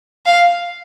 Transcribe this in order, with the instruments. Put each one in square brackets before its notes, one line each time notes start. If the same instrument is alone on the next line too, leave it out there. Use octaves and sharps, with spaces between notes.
[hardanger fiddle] F5